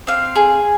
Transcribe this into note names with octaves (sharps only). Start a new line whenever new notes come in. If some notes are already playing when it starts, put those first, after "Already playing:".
C4 F5
G#4